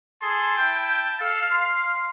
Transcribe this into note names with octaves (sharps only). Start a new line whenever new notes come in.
G#4 A4 A5 C6
E4 G5
A4 F5
C6